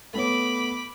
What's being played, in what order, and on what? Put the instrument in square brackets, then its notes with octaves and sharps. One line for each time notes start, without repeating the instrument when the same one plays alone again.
[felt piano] A3 B3 C#5 [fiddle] B5 D6